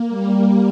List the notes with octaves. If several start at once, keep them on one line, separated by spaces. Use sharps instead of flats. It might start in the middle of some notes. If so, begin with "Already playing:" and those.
Already playing: A#3
G3